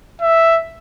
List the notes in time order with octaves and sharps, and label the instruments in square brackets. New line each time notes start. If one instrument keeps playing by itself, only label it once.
[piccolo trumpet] E5